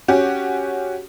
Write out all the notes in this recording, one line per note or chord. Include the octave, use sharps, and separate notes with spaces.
C#4 F#4 G4